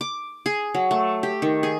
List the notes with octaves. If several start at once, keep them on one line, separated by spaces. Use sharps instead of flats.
D6
G#4
F#3
A3
G4
D#3
G#4